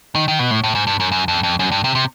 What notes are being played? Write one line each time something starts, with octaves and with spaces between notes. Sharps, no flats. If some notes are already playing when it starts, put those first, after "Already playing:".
D#3
D#3
B2
A2
A2
G#2
G2
F#2
F#2
F2
F2
F#2
G2
C3
C3